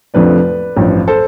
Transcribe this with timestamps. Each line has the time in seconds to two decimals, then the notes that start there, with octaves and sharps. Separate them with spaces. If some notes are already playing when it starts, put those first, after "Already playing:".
0.14 F1 F2 D3 F3 A3 B4 D5
0.77 A1 G2 F3
1.08 A4 C5